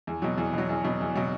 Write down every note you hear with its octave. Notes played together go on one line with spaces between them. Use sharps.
E2
B2 F#3
E2
B2 F#3
E2
B2 F#3
E2
B2 F#3